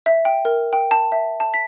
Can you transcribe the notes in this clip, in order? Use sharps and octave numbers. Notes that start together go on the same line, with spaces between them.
E5
G5
A#4
G5
A5
E5
A5
B6